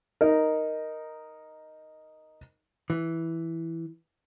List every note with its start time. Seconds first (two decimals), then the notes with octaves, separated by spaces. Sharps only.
0.21 D#4 A#4
2.90 E3